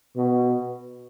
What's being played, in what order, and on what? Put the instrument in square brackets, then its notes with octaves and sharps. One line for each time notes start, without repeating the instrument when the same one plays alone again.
[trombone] B2